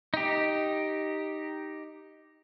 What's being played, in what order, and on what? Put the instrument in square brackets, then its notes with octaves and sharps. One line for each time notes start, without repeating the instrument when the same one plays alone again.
[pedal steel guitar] D#4 G4